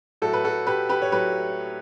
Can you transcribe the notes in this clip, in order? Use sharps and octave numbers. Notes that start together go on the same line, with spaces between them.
A2 F#3 A3 F#4 A4
B4
F#4 A4
G4 B4
G4 B4
C#5
A2 F#3 A3 G4 B4